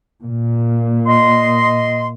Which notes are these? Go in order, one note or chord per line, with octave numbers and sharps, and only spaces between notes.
A#2
D#5 C6